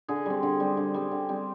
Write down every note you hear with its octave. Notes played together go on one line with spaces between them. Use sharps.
D3 G#4
G3 C4
D3
G3 C4
D3
G3 C4
D3
G3 C4